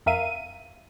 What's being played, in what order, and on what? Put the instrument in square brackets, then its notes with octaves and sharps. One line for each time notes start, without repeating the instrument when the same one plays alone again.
[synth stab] F2 A#4 E5 F5 D#7